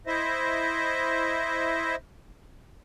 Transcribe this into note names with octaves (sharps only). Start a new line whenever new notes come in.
E4 C5 D#5 E5